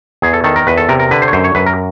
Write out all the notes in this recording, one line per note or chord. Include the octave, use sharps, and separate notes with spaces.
E2 G#4
A4
D#3 A4
A#4
E2 B4
A4
C3 A#4
A#4
D3 B4
C5
C#5
F#2 C5
C#5
F#2 B4
A#4